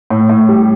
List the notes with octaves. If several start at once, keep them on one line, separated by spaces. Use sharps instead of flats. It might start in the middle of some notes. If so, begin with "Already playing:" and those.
A2
A2
G3